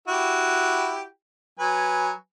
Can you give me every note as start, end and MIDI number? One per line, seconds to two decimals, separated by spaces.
0.08 1.04 64
0.08 1.04 66
0.08 1.04 67
1.59 2.11 54
1.59 2.11 71
1.59 2.11 80